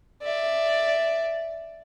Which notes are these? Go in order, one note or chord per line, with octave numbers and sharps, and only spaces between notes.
D5 E5